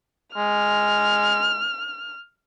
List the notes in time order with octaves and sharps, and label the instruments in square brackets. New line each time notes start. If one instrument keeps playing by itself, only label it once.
[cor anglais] G#3 [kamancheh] F6